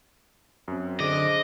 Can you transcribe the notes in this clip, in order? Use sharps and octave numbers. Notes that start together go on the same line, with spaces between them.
F#2 C4
D3 G#4 C5 D#5 D6